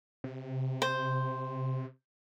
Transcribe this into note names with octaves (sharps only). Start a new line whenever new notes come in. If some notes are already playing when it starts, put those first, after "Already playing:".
C3
C5